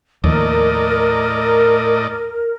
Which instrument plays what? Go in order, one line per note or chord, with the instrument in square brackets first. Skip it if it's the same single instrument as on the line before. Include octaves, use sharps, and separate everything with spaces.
[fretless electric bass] D#2 F3 [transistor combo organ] A2 D5 D#5 [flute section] A#4